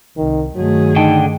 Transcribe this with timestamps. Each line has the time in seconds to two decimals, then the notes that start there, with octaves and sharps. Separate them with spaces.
0.17 C2 D#3
0.55 G2 D#3 F#3 A3 G#4
0.96 D3 D#4 G5 A5